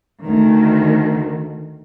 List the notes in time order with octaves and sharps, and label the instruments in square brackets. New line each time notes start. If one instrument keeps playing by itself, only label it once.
[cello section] D2 D#3